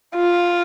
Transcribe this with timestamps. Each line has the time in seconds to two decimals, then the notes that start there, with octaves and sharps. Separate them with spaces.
0.15 F4